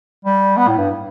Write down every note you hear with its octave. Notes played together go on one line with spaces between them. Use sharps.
G3
B3
A2
G2